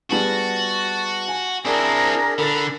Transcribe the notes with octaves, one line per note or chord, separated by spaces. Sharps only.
G3 B3 F#4 G#4 A5
G#5
C4 D4 E4 G#4 A#4
D3 A4 A#4 B5 A6